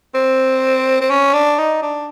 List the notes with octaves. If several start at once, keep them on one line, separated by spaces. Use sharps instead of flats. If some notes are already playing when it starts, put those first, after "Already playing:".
C4
C4
C#4
D4
D#4
D4